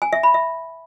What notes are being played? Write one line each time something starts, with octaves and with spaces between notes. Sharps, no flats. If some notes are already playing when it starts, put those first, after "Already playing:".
G#5
E5
B5
E5